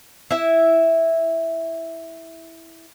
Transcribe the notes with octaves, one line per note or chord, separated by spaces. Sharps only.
E4 E5